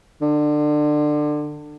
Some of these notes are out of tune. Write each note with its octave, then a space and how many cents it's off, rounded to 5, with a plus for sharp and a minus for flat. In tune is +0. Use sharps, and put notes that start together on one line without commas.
D3 +25